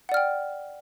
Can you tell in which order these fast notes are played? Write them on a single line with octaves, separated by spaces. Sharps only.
F#5 D5 F6 G5